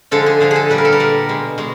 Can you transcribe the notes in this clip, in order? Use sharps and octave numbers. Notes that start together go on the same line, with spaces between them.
D3 F3 G#3 A4
G#4
D3 F3 G#3 G#4
G#4 A4
A#2 G3 B4
A#4
A4
A#4
A#2 G3
B2 G#3
B2 G#3